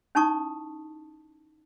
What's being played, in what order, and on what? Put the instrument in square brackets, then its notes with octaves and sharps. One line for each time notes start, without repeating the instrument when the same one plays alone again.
[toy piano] C#4 D#4 E4 A5 C#6 D#6